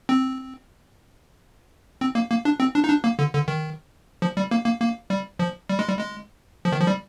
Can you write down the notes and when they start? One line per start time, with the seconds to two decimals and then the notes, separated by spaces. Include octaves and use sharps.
0.09 C4
2.01 C4
2.15 A#3
2.30 A#3
2.45 D4
2.60 C4
2.75 D4
2.84 D#4
2.89 D4
3.04 A#3
3.19 D3
3.34 D3
3.48 D#3
4.22 F3
4.37 G3
4.51 A#3
4.65 A#3
4.80 A#3
5.10 G3
5.39 F3
5.70 G3
5.79 G#3
5.88 G3
5.99 G#3
6.65 F3
6.72 D#3
6.81 F3
6.87 G3